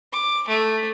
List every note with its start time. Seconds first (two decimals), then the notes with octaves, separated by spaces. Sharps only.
0.13 D6
0.48 A3